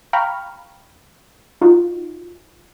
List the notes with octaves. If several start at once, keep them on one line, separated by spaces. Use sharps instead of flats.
F5 G5 A#5 B5 C#6 F6
D#4 F4 F#4